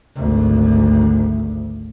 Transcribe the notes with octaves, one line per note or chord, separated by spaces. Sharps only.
G#1 D2